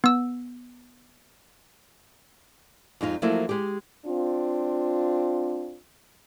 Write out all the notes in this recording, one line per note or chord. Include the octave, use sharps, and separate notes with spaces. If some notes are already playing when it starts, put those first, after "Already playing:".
B3 E6
F2 G#3 D#4 F4
F3 F#3 A3 A#3 E4
G#3 G4
C4 D4 F4